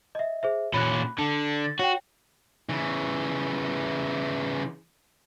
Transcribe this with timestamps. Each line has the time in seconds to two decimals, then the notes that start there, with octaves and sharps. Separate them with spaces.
0.15 D#5 E5
0.43 G#4 C5 E5
0.74 A#2 C#4 B5 F#6
1.19 D3 A5
1.64 A6
1.79 F#4 C#5 G5
2.69 C#3 E3